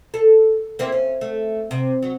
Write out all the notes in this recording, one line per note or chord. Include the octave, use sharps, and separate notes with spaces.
A4
A#3 C4 E4
C#4
A3
C3
F#3